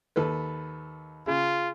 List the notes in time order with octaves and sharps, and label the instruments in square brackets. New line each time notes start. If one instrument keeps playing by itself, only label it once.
[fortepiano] D#2 A4 B4
[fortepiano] C#3 [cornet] F4